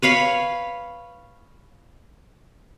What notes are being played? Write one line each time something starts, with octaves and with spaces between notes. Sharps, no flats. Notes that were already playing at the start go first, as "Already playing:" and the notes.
B4 C#5 F5 B5